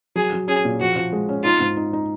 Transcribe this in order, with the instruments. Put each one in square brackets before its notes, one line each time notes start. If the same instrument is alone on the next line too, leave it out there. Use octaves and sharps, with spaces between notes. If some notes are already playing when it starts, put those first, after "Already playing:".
[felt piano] F#3 [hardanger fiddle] G#4
[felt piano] F#3
[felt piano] C#4 [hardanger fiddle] G#4
[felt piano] A#2
[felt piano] F3 [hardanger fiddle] F#4
[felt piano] F3
G#3
C#4
[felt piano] D#4 [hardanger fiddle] F4
[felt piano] G#2
D#4
D#4